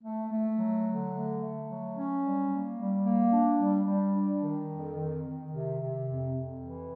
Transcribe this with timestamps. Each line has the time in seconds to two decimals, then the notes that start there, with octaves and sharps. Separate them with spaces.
0.04 A3
0.31 A3
0.59 F#3
0.86 D3
1.14 A3
1.40 A3
1.69 F#3
1.95 C#4
2.23 G3
2.50 A#3
2.77 G3
3.05 A#3
3.32 D4
3.59 G3
3.87 G3
4.15 D4
4.42 D#3
4.69 F2
4.96 D#3
5.25 D#3
5.51 C3
5.80 C3
6.07 F2
6.33 F2
6.61 E3